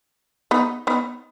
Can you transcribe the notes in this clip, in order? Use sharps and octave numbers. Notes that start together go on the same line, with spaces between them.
B3 D#4
B3 D#4